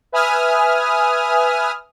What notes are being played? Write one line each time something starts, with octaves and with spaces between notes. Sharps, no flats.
B4 E5 G#5 D#6 F6